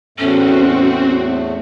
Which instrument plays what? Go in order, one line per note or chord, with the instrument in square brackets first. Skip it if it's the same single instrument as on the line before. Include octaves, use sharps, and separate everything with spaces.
[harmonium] E2 A2 A3 [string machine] C4 F#4 [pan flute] C#4